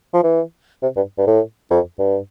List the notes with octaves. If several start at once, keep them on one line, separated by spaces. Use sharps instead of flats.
F3
E3
C3
G2
G2
A2
F2
G2